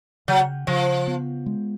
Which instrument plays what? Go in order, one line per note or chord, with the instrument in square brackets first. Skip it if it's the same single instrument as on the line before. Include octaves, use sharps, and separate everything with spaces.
[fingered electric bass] C#3 [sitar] F#3
[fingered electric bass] C#3 [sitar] F3
[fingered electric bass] B3
G#3